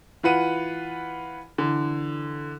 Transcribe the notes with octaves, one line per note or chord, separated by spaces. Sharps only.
E3 F4 B4 F#5 D#7
D3 E3